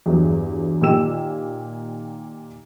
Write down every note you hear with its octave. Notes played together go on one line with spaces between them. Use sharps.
E2 G2 F#3
A#2 D#3 A#3 G4 E6 E7